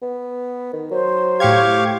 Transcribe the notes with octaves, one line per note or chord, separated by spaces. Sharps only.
B3
D#3
F#3 C5
A2 G4 F5 C#6 G#6